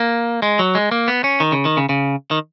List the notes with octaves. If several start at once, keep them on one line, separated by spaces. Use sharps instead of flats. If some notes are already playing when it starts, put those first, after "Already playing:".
Already playing: A#3
G#3
F#3
G#3
A#3
B3
C#4
D#3
C#3
D#3
C#3
C#3
D#3